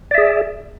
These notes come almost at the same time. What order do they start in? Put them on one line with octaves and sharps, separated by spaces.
D5 E5 G#4